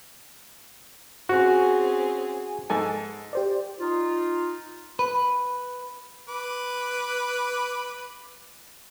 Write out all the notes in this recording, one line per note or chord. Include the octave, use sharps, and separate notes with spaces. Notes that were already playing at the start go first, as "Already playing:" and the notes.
C4 C#4 F#4 G#4
G#2 A4 G#5
G4 C5 D5
D#4 F4
B4
B4 D6